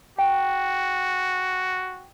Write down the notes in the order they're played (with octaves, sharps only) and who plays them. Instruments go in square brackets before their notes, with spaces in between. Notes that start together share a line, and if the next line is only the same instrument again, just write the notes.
[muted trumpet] F#4 [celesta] G5